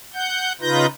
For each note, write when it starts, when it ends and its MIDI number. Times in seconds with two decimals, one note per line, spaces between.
0.14 0.53 78
0.14 0.53 91
0.61 0.86 49
0.61 0.86 63
0.61 0.86 65
0.61 0.86 71
0.61 0.86 91
0.61 0.86 94